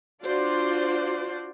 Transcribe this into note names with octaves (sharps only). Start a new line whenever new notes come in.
D4 F4 F#4 C5 D5